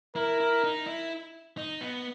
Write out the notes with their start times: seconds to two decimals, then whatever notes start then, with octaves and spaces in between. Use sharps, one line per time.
0.16 E4 A#4
0.40 E4
0.64 D#4
0.87 E4
1.57 D#4
1.81 B3